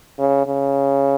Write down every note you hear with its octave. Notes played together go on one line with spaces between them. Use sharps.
C#3
C#3